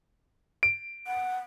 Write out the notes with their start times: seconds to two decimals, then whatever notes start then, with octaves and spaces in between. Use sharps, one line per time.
0.63 D7
1.07 F#5